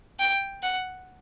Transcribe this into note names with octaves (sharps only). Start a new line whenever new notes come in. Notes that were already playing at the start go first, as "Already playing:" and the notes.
G5
F#5